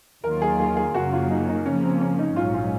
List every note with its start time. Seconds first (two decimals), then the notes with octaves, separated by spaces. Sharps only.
0.24 D#2 D#3 F#3 A#3 F4 A#4
0.42 G#4
0.59 G#4
0.77 G#4
0.94 F#2 C#3 F#3 A#3 F#4
1.12 F4
1.30 D#4
1.48 D#4
1.65 C#3 F3 A#3 C#4
1.83 C4
2.01 C#4
2.19 D#4
2.36 A#1 G#2 F#3 C#4 F4
2.54 F4